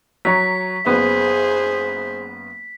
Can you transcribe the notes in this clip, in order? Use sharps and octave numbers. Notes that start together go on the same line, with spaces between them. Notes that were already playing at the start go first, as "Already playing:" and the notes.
F#3 C#5 A#5 B6
F#1 B3 G#4 C5